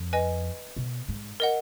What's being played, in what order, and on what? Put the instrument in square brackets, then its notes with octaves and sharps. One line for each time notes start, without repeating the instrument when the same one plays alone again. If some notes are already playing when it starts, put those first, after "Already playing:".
Already playing: [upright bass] F2
[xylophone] B4 D#5 G#5
[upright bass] B2
G#2
[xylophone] A#4 D#5 F#5